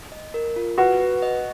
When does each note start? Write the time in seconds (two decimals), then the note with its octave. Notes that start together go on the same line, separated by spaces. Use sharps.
0.12 D#5
0.34 A#4
0.56 F4
0.78 F#4 B4
1.00 B4
1.22 D#5